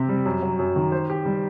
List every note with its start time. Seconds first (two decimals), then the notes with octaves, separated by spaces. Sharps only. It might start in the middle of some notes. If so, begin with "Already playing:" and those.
Already playing: C3 C4 G4
0.09 G3
0.25 F#2
0.42 F#3
0.59 F#2
0.76 D#3
0.92 C5
1.10 G4
1.26 G3